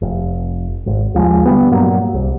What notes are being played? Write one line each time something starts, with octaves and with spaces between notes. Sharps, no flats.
F1
G#1
D#2 F3 G3 G#3
D3 F#3 G3 B3
G2 A#2 F#3 A#3
C2